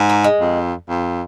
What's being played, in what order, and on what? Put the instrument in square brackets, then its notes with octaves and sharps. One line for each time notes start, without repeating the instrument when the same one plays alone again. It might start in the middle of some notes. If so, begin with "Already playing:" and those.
Already playing: [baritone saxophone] G#2
[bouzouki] A#3
G#3
[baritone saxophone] F2
F2